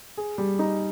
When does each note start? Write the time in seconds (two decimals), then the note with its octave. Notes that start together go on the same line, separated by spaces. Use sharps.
0.17 G#4
0.38 G3
0.59 D#4